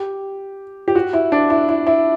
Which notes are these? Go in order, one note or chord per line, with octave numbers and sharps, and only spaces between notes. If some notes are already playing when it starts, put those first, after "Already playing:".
Already playing: G4
G4
F#4
E4
D4
E4
E4
E4